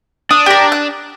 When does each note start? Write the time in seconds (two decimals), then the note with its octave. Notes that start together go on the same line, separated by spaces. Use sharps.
0.31 D4 D#6
0.46 G4 A#4
0.72 F#6